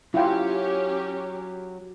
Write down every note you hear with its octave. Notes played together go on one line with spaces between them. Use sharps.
F#3 C#4 E4 F4 G4 G5